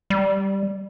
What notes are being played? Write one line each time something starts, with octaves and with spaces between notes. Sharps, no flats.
G3